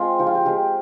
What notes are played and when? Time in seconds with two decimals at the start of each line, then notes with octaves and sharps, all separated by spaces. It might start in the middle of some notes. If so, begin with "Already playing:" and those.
Already playing: G#3 C4 F4 G#4
0.19 F3 G4
0.27 F4
0.35 G4
0.45 G#3 C4 G4